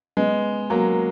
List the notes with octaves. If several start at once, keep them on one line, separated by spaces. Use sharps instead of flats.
G#3 B3
F#3 A#3